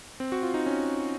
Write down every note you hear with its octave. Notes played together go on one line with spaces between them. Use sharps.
C4
F#4
F4
D#4
C#4